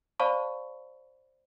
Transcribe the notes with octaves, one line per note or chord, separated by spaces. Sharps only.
C5 D5 F5 A5 B5 C#6